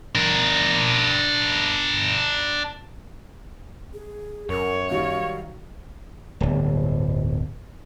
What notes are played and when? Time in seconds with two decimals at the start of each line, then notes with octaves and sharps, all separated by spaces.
0.15 D4 A#4
3.94 G#4
4.49 F#2 A#4 C#5
4.90 D#3 F#3 G3 F5
6.40 D1 G1